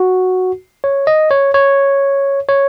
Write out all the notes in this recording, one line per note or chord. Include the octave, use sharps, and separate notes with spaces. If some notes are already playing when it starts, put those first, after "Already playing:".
Already playing: F#4
C#5
D#5
C#5
C#5
C#5